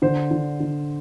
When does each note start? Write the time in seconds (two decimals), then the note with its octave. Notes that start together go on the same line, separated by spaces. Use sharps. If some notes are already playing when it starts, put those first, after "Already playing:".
0.02 D3 C5
0.31 D3
0.60 D3